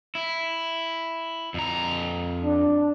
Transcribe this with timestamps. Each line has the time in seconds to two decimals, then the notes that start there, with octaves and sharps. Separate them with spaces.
0.15 E4
1.54 F2 A#5
2.44 D4